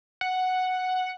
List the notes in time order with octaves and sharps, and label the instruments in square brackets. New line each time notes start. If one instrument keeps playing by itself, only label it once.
[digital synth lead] F#5